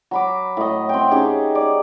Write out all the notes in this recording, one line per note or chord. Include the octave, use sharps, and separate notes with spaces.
F#3 B5 D6
A2 D#5
C4 G5
C#4 D#4 G4 G#4
D5